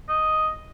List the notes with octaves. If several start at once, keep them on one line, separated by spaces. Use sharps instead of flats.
D#5